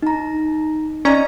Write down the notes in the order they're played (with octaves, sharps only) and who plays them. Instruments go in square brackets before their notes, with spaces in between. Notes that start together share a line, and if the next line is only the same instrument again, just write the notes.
[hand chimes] D#4 A#5
[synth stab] C#4 A#5 [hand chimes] D5 D#5